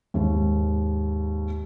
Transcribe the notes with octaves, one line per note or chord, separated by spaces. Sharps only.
D#2 G#2